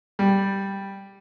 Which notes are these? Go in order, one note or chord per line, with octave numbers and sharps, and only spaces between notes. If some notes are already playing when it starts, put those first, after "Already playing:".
G3